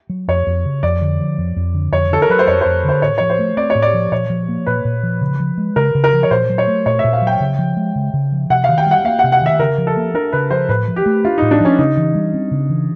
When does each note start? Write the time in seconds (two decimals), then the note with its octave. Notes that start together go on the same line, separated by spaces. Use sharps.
0.10 F#3
0.28 F2 C#5
0.47 F2
0.65 C#3
0.83 F2 D5
1.02 D3
1.19 F3
1.38 F2
1.56 F2
1.74 D3
1.92 F2 C#5
2.11 D3 A4
2.22 A#4
2.30 F#3 B4
2.39 C5
2.47 F2 C#5
2.61 F2 C5
2.85 D3 C5
3.02 A2 C#5
3.18 F3 C#5
3.30 C5
3.39 A3
3.57 C4 D5
3.70 C#5
3.75 A2
3.82 D5
3.94 F3
4.12 A#2 C#5
4.30 F3
4.49 A#3
4.66 A#2 B4
4.85 A#2
5.03 F3
5.21 C#3
5.40 F3
5.58 G#3
5.76 C#3 A#4
5.95 C#3
6.04 A#4
6.13 F3
6.23 C#5
6.31 A#2 C5
6.50 F#3
6.58 C#5
6.67 A3
6.86 A#2 C#5
6.99 E5
7.04 A#2
7.13 F5
7.22 F#3
7.27 G5
7.40 C#3
7.59 F3
7.77 G#3
7.96 C#3
8.14 C#3
8.32 F3
8.50 C3 F#5
8.64 F5
8.69 D#3
8.78 G5
8.87 G3 F#5
9.04 A#3 F5
9.19 F#5
9.24 C3
9.32 F#5
9.41 D#3 E5
9.59 C#3 A#4
9.78 F3
9.87 A4
9.97 A#3
10.14 D4 A#4
10.33 C#3 B4
10.51 F3 C5
10.69 A2 B4
10.88 F3
10.96 G4
11.06 A3
11.24 D4 F4
11.38 A2 D#4
11.51 D4
11.60 F3 C#4
11.78 C#3 D#4
11.97 E3
12.15 G3
12.34 C4
12.51 C#3
12.70 E3